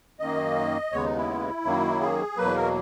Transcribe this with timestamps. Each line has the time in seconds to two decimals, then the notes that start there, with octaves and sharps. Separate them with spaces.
0.20 F#2 D#3 A#3 D#5
0.92 D#2 C#3 G#3 B3 C#5
1.04 D#4
1.16 E4
1.64 F#2 D#3 F#3 A#3
2.00 G#4
2.36 E2 B2 F#3 A#3 B4
2.55 A#4